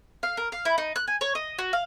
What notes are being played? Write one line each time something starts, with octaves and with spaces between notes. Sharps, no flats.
F5
A#4
F5
E4
D#4
F#6
G#5
C#5
D#5
F#4
F5